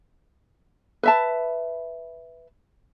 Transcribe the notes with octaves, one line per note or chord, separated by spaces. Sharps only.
B4 E5 A5